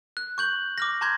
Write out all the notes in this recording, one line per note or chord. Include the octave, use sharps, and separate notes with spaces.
F#6
C#6 G6 F#7
D6 F6 A#6
A5 A#5 C6 C#6 G6 G#6